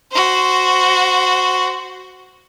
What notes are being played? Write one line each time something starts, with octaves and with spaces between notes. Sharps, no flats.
F#4 C5